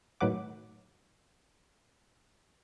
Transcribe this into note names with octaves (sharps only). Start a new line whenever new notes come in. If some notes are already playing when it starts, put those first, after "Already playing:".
A2 D#3 F#3 B4 F#5 D6